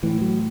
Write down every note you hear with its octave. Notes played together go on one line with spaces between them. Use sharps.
A2 E3
F#3